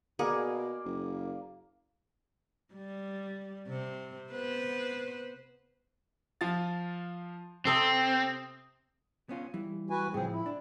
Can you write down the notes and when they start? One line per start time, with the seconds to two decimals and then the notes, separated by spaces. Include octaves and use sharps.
0.19 B2 A#3 G#4 D5
0.85 F#1
2.74 G3
3.68 C3 C4
4.30 B3 B4 C5
6.41 F3 F5 A6
7.65 C3 C4 A4 D#6
9.29 B3 C#4 F4
9.54 E3 G3
9.90 F#4 B4 G#5
10.14 A2 C#3 F3 C4 G#4
10.32 E4
10.46 D4